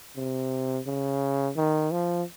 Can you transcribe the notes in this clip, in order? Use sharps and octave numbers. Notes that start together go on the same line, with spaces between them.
C3
C#3
D#3
F3